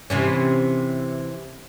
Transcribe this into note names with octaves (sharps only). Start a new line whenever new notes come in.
C3 E3 C#4